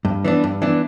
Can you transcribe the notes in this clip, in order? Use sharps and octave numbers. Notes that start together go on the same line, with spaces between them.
G2
E3 B3 D4
G2
E3 B3 D4